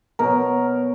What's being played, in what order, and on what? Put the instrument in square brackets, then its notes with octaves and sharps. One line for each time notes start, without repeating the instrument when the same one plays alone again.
[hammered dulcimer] B2 F#3 A#4